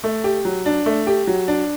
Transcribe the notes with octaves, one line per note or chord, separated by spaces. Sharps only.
A3
G4
F#3
D4
A3
G4
F#3
D4